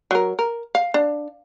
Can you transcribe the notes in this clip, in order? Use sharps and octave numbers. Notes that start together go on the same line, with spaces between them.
F#3 A#4
A#4
F5
D4